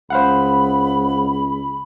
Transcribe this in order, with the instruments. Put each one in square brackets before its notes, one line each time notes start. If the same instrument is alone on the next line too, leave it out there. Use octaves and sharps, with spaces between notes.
[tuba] C#2 [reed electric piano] C5 F5 F#5 [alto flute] B5